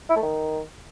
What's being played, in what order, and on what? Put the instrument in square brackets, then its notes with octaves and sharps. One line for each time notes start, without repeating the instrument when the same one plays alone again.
[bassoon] E4
A3
D#3